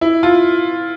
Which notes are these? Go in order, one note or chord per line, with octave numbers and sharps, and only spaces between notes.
E4
F4